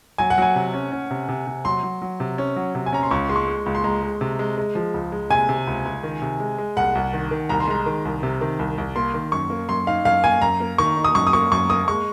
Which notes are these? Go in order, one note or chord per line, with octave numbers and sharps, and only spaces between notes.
F#3 G#5
F#5
F#3 G#5
C3
C#4
C#4
C3
C3
C3
F#3 C6
F#3
F#3
C3
C#4
F#3
C3
G#5
C#4 A#5
C6
C#2 C#6
G#3 C6
C#6
G#3
C#2
C6
G#3 A#5
G#3
C3
G#3
G#3
F3
C#2
G#3
C3 G#5
C3
C#2
C#2
D#3
C3
G#3
G#3
C2 F#5
C2
D#3
D#3
C2 A#5
C6
G#3 A#5
D#3
C2
C3
D#3
C2
C2
A#3 C6
D#3
F#2 C#6
A#3
F#2 C6
D#4 F5
F#2 F5
A#3 G#5
F#2 A#5
A#3
D#3 C#6
D#4
D#6
F#2 C#6
D#6
A#3 C#6
F#2 C#6
A#3 D#6
G#3 C#6